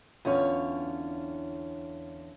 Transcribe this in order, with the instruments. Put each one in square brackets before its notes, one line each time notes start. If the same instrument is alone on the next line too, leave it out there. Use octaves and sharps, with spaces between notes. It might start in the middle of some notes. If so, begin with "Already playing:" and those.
[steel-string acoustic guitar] E2 D3 C#4 F4 C#5